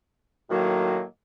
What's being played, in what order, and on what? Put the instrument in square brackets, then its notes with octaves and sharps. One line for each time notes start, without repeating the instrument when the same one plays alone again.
[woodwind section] A2 D#3 F#3 A#3 F#4